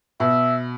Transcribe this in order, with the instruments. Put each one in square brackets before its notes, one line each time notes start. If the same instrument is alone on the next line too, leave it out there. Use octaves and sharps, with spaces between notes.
[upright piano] B2 [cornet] E5